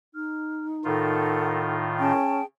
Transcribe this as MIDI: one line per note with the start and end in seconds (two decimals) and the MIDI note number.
0.14 1.85 63
0.14 0.65 89
0.85 2.13 45
0.85 2.13 51
0.85 2.13 65
0.85 1.73 69
0.85 1.73 70
0.85 1.73 78
1.99 2.41 61
1.99 2.43 68
1.99 2.43 79
1.99 2.43 81